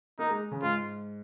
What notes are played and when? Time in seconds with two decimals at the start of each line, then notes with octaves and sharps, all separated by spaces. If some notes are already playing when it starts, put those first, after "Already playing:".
0.19 A#3 D#4
0.30 G#3
0.52 C#3
0.62 G#2 F4